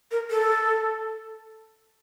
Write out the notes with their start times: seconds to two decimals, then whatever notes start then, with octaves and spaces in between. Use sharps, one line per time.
0.11 A#4
0.31 A4